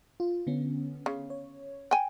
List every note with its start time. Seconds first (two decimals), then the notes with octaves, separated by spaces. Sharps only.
0.20 F4
0.47 D3 B3 C#4
1.06 C#3
1.30 C#5
1.91 G5 G#5